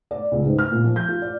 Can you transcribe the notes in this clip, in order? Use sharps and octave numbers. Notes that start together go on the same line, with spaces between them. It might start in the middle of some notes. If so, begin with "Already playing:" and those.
D5
C#2
G#2
F6
A#2
F3
G6
F4
D5